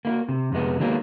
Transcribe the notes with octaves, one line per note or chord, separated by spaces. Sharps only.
A#3 E4 F#4
C3
F2 C3 G#3 B3
D#3 F#3 G#3 A#3 B3